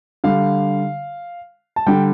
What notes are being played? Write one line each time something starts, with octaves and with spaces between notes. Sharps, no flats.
D3 G3 F5
A5
D3 G3 G5